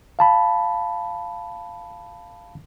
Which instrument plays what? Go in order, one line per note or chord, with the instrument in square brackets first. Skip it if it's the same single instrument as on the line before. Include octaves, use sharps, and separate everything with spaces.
[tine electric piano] F5 A5 B5